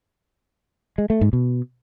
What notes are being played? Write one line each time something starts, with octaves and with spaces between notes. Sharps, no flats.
G#3
A3
G#2
B2